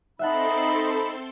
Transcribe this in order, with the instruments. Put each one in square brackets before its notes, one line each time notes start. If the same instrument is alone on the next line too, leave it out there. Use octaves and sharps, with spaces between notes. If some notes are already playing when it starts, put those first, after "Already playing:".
[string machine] C4 A4 C6 [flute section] D#4 B5 [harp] E5 F#5 A5